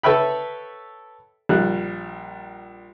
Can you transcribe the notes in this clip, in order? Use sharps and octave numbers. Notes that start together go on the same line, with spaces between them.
A4 B4 C#5 E5 G5 B5
A#1 G3 F#6